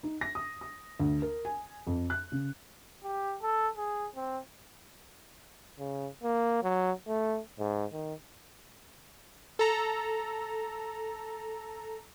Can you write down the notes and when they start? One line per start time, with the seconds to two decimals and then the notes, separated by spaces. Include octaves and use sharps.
0.03 D#4
0.21 A#6
0.35 D#6
0.61 D#6
1.00 D2
1.22 A#4
1.45 G#5
1.87 F2
2.10 F#6
2.32 C#3
3.04 G4
3.42 A4
3.77 G#4
4.16 C4
5.79 C#3
6.23 A#3
6.63 F#3
7.08 A3
7.59 G#2
7.92 D#3
9.59 A4 A#5